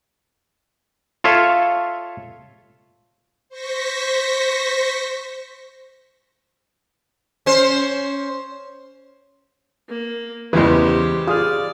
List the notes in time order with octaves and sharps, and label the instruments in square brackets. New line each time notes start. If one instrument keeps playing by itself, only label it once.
[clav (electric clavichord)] F4 A4 C#5 E5 F5
[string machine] C5 C#6 A#6 B6
[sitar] C#4 C5
[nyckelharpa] A#3
[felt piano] E2 B4 [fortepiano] C#3 G3 G#3 [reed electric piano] E3 [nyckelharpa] G4 C5
[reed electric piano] F4 G#4 F6 [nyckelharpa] D5 [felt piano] D#6